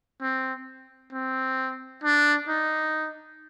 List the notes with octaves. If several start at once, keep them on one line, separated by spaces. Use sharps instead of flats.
C4
C4
D4
D#4